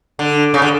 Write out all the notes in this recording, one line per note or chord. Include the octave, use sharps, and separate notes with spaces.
D3
C#3
D3